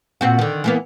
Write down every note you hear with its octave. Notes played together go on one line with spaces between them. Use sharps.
A#2 C4 F#4
D3 D#3
E3 A#3 B3